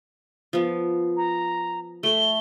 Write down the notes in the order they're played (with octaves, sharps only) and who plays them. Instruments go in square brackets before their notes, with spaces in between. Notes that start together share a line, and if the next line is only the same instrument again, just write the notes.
[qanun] F3 B3
[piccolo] A#5
[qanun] A3 A4 [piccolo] G7